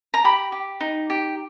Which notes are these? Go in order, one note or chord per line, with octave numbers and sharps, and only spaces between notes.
A#5
G4 B5
G4
D#4
G4